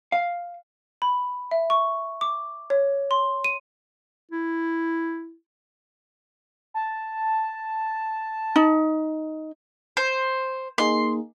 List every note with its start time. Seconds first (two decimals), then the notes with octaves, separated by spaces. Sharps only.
0.12 F5
1.02 B5
1.51 E5
1.70 C#6
2.21 D6
2.70 C#5
3.11 C6
3.44 D#7
4.31 E4
6.74 A5
8.56 D#4
9.97 C5
10.78 A#3 D#4 G#4 C6